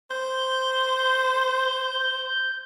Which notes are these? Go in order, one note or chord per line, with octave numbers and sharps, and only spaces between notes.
C5 G6